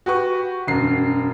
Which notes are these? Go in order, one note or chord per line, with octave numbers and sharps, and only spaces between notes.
F#4 G4 B4 C#6
E1 F#2 C7